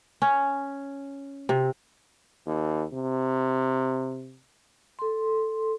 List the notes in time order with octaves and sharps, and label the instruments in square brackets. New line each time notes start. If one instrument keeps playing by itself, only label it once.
[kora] C#4
C3
[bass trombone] D#2
C3
[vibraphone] A4 C6